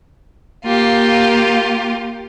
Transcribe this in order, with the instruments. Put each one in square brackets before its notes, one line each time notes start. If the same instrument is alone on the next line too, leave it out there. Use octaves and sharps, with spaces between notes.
[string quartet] A#3 F4 G4